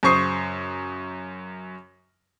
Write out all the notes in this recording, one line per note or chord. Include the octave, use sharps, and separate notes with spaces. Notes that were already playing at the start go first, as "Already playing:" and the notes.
F#2 C#3 C5 C#6 D#6 C7